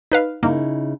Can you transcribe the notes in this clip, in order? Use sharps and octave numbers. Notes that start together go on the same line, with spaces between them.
D#4 B4 F5
C#3 A#3 D#4 E4